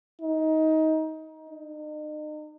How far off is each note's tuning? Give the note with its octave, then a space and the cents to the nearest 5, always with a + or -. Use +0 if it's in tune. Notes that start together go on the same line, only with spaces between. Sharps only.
D#4 +20
D#4 -40